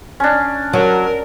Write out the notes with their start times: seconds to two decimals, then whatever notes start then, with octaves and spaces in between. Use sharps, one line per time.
0.20 C#4 D4
0.73 F#3 A#4